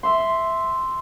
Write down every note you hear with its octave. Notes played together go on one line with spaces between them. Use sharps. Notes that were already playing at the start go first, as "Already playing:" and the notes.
E5 C6